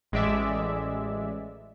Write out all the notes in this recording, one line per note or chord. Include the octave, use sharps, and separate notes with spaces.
A1 G#3 D5 E5